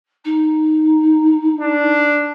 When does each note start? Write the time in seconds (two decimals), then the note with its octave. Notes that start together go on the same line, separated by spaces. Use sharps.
0.24 D#4
1.61 D4